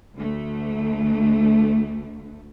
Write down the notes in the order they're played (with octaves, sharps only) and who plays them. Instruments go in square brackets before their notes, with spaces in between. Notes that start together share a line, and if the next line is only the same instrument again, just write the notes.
[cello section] D2 A3